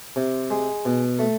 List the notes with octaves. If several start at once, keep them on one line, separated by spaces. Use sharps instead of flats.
C3
G#3
B2
A3